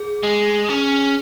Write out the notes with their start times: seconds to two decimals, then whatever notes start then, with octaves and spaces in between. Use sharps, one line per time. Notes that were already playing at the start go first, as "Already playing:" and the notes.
Already playing: G#4
0.24 G#3
0.70 C#4